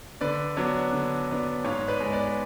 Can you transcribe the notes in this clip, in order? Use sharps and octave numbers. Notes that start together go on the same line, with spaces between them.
D3 B4 D5
F#3 B3 D4
D3
F#3 B3 D4
G#2 C#5 F5
B4 D5
G#3 B3
B4 D5